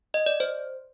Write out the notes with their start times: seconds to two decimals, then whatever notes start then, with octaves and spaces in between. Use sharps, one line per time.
0.14 D#5
0.26 D5
0.40 C5